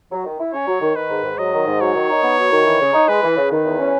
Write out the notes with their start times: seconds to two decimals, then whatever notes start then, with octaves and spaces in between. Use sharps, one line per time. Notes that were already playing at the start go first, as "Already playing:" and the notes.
0.11 F#3
0.26 D#3
0.40 E4
0.53 C#4 C#5
0.67 F#3
0.81 D#3
0.95 D#3 B4
1.10 G#2
1.24 G#2
1.38 F#3 D#5
1.53 D#3
1.67 G#2
1.81 F#3 C#5
1.94 D#3
2.09 D#4
2.23 B3
2.38 F#3
2.51 D#3
2.65 E3
2.80 C#3
2.93 D#4
3.08 G#3 B4
3.23 E3
3.37 C#3
3.51 D#3 B4
3.65 E2
3.79 C#4